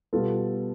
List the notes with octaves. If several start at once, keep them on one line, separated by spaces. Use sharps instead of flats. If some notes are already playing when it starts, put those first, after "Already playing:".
B2 G3 B3 F4 A4